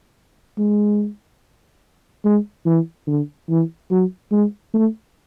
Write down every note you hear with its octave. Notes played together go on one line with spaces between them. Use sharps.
G#3
G#3
E3
D3
E3
F#3
G#3
A3